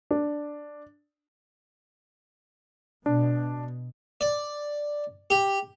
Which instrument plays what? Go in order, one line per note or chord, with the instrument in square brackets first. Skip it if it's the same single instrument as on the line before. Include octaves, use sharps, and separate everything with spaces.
[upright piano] D4
[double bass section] B2 [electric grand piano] D4
[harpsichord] D5
G4